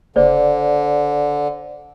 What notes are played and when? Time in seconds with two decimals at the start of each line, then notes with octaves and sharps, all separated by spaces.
0.16 F#1 D3 C5 D5